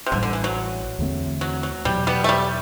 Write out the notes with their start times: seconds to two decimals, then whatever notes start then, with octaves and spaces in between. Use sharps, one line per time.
0.06 C3
0.12 A1 A2 D3 G3
0.23 D3
0.33 E3
0.44 F#3
0.99 E2 D3 A3 C4
1.41 F#3
1.63 F#3
1.85 E2 B2 F#3 G3
2.07 G3 B3
2.24 A3
2.29 G3